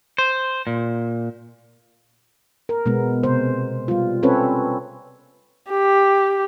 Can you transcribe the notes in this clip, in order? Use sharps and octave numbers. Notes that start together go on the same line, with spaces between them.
C5
A#2
A#4
B2 G#3 B3
C3 C5
G3 F4
C4 C#4 A4 B4 C#5
G4